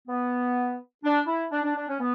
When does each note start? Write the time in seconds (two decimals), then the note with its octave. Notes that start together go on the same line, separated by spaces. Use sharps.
0.08 B3
1.04 D4
1.27 E4
1.51 D4
1.63 D4
1.75 D4
1.88 C#4
1.99 B3